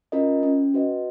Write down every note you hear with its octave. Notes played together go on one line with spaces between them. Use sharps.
C#4 F4 A#4 D#5
C#4
F#4 B4 D#5